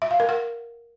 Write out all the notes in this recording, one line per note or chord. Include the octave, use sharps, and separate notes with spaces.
E5
F5
A#4
F#5